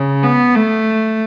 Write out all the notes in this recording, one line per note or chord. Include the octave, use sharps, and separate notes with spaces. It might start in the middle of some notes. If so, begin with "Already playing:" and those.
Already playing: C#3
B3
A3